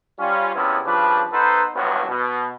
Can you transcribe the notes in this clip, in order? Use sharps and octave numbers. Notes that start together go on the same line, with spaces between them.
G3 C#4 F4
E2 C3 F3 B3 C#4 E4
C#3 F3 G3 D4 B4
B3 D#4 A4 B4 C5
A1 G2 A#2 F3 F#3 B3
B2